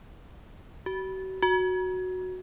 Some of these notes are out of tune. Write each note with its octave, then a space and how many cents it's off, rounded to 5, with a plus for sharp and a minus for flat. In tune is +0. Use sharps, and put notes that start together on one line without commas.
F#4 +40
F#4 -5